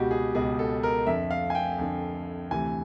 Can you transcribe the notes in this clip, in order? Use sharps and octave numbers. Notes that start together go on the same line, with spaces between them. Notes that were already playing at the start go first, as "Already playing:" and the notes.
Already playing: C#2 B2 F#4 G4
G#4
C#2 B2 G#4
A4
A#4
F2 D3 E5
F5
G#5
G5
F2 D3
D2 C3 E3 G#5